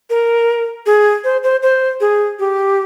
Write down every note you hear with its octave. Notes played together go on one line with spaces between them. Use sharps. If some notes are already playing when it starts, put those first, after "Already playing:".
A#4
G#4
C5
C5
C5
G#4
G4